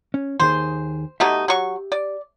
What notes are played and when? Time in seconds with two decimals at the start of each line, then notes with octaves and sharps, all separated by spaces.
0.14 C#4
0.40 D#2 D#3 G#4 C5
1.20 B2 A3 D#4 G4 E5
1.48 F#3 C#6
1.92 D5